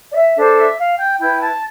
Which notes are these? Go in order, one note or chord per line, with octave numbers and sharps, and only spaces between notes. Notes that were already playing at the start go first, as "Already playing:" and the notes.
D5
E5
D4 A4 C5
E5
F5
G5
E4 B4 G5
A5